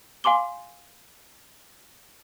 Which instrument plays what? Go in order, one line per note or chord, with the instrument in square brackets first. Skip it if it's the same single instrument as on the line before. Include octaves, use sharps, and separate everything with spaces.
[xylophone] F5 G#5 C6 D6 G7